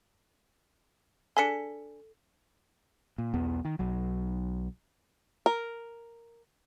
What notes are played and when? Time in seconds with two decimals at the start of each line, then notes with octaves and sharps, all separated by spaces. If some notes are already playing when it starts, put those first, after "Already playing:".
1.37 D4 G#4 A4 B6 C#7
3.18 A#2
3.34 B1 E2 B3
3.65 D#3
3.79 B1 F#3
5.46 A#4